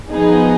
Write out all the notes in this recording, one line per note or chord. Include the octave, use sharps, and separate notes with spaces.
F3 B3 D#4 G#4